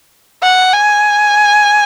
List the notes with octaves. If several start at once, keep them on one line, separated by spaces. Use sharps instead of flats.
F#5
G#5